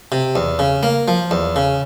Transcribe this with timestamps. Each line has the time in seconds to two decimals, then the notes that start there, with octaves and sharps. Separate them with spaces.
0.12 C3
0.36 E2
0.59 C#3
0.83 A#3
1.08 F3
1.31 E2
1.56 C#3